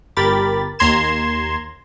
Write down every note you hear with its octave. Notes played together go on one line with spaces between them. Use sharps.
G1 G4 A#4 B5 A6
D#2 A#5 C6 G#6 E7